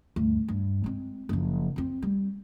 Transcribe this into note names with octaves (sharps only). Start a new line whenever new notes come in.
D2 G2
G2
G#3 C4
F#1 F3
F2 C4
G3